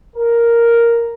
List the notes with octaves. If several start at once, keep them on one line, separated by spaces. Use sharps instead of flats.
A#4